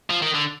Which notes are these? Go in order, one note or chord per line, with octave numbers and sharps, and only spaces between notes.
F3
D#3
D3